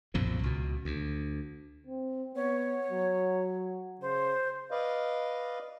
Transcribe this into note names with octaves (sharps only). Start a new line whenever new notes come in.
B1 F#2 A#2 F3
C#2 B2
D2
C4
B3 C#5
F#3
C#3 C5
B4 D5 D#5 F5